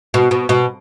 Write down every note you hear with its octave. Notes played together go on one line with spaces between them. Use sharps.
B2
B2
B2